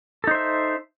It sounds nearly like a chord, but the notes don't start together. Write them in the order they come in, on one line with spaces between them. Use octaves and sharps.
A4 D#4 C5 E5